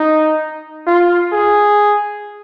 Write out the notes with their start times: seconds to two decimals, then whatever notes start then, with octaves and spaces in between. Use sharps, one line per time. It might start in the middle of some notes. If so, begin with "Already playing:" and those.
Already playing: D#4
0.87 F4
1.33 G#4